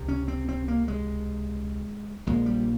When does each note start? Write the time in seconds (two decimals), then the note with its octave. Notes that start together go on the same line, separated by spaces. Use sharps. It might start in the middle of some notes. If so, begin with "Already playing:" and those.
Already playing: C#2 C3
0.08 C#4
0.28 C4
0.49 C4
0.68 A#3
0.88 G#3
2.26 A#1 A#2 G#3
2.46 G3